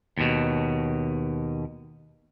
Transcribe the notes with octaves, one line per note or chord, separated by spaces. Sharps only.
D#2 B2